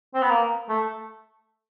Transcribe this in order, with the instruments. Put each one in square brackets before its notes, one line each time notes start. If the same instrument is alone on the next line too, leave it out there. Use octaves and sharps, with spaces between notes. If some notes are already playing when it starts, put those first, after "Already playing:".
[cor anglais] C4
B3
A#3
A3